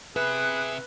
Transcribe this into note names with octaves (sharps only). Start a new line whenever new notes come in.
C3 G#4 B4 E5 F#6